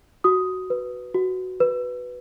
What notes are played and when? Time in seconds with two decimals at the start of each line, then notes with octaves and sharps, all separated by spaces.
0.24 F#4 D#6
0.70 B4
1.14 F#4
1.60 B4